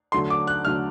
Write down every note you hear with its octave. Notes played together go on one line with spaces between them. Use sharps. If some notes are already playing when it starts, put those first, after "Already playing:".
D3 F#3 A3 C6
D6
F#6
D3 F#3 A3 F6